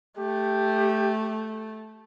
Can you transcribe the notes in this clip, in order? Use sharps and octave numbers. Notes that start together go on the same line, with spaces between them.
A3 G4